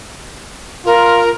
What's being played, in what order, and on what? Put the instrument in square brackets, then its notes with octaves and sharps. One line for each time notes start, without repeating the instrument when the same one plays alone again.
[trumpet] F4 [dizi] A#4